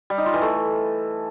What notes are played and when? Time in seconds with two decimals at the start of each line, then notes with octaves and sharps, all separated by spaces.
0.10 G3
0.18 D#4
0.26 F4
0.34 E3
0.42 A3